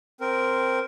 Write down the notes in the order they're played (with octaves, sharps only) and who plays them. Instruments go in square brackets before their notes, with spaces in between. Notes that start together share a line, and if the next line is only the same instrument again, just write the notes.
[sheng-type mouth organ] C4 A#4